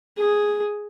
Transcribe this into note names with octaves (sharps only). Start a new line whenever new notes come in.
G#4